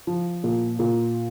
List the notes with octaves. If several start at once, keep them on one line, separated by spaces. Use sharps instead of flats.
F3
A#2
A#2